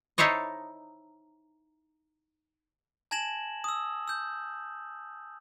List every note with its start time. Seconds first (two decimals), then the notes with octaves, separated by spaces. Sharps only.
0.18 D#4 E4 A4 C5 C#5 D#5
3.11 G#5 A5 G#6 A#6 E7 F#7
3.64 D#6 E6
4.08 E6 G6